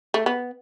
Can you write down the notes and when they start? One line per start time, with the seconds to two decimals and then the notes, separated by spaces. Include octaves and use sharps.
0.14 A3
0.26 B3